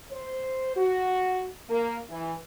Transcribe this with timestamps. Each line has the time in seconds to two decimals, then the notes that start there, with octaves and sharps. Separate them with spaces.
0.12 C5
0.76 F#4
1.69 A#3
2.09 E3